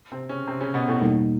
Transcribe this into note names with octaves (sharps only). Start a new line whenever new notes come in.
C3 C4
C#3 C#4
C3 C4
C#3 C#4
B2 B3
A2 A3
E2 B2 G3 A#3 D#4